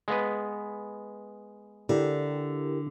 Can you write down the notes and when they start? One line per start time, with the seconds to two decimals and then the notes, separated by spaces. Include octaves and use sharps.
0.08 G#3 B3 B4
1.89 D3 E4 G4 A#4